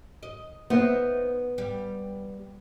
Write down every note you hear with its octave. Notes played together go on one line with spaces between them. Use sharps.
D#5
B3 D#4 C5 E5
G3